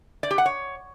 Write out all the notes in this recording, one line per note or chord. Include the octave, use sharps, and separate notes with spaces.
D5
G4
F#5
C#5